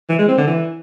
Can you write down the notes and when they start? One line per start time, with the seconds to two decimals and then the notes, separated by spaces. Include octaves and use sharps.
0.09 E3
0.19 G#3
0.28 C4
0.38 D3
0.47 E3